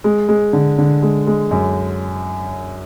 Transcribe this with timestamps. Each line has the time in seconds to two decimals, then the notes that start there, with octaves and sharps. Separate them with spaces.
0.04 G#3
0.29 G#3
0.53 D3
0.78 D3
1.02 G#3
1.27 G#3
1.51 F#2